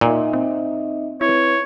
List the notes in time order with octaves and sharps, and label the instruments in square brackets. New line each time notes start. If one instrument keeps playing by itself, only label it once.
[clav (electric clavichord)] A#2 [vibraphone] D#4 D#5 E5
[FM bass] C4
[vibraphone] C4 B4 [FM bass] E4 [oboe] C#5